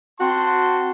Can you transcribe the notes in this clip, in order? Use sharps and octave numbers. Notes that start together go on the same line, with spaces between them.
C4 F#4 A5 C6